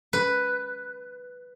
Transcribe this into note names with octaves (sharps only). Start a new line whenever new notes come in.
B4